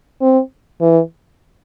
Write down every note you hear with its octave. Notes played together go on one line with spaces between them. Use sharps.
C4
E3